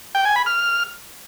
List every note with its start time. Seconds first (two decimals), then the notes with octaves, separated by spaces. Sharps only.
0.15 G5
0.25 G#5
0.36 B5
0.46 F6